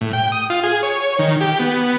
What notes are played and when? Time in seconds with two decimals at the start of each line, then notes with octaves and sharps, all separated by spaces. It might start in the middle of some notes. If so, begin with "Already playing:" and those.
0.01 A2
0.13 G5
0.32 D#6
0.50 F4
0.64 G#4
0.83 C#5
1.19 D#3
1.41 G4
1.59 B3